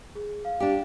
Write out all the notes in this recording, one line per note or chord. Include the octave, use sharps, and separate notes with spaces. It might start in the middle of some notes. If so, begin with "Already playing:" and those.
G#4
F5
D4 G4